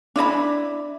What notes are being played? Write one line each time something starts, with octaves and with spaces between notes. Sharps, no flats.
D4 E4 D#5 B5